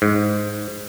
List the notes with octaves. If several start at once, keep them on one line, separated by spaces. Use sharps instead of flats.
G#2